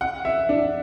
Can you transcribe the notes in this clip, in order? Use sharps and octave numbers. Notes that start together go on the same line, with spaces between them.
F#5
E5
D4